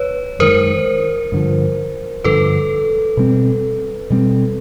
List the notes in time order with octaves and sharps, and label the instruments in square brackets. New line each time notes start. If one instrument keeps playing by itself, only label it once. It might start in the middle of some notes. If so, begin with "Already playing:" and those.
Already playing: [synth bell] B4 C#5
[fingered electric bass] F#2 D#3 G#3 [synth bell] A#4 C5
[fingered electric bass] G2 D3 F3
[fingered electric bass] G2 D3 F3 [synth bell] A4 B4
[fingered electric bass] B2 G3 C4
B2 G3 C4